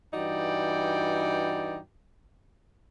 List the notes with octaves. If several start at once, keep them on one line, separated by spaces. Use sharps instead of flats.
G2 E3 D#4 F#4 D5 G5